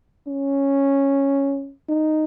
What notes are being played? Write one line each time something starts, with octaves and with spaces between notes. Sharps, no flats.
C#4
D#4